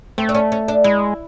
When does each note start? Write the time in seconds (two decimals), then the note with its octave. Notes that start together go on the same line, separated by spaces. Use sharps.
0.18 A3 C4
0.29 D4
0.35 C#4
0.52 C#4
0.68 D4
0.84 G#3 E4